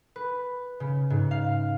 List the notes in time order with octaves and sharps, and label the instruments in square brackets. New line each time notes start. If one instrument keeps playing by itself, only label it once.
[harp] B4
C#3
G#2
F5